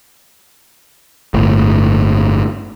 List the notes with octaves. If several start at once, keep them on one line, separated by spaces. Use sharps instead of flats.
G1 A2